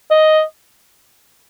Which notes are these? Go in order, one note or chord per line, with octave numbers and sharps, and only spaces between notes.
D#5